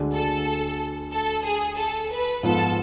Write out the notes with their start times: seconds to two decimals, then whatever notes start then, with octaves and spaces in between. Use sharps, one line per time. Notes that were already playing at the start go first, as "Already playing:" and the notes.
Already playing: D2 D3 G#3 D4
0.12 A4
1.12 A4
1.44 G#4
1.78 A4
2.11 B4
2.43 G#2 F3 B3 F4 A4